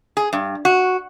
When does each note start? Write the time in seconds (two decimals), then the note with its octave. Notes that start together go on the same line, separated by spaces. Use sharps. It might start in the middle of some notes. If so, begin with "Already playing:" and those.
0.17 G#4
0.33 G2
0.65 F#4